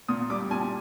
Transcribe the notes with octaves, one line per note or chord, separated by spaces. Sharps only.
A#2 D#6
G3 D6
A#2 G#5